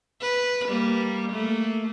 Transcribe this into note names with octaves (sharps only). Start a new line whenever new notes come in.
B4
G3 A#3
A3 A#3